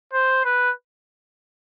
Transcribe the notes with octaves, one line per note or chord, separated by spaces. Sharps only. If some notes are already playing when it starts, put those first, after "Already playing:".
C5
B4